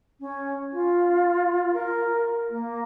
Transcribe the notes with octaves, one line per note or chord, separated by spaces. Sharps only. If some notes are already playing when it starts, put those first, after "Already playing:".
C#4
F4
A#4
A#3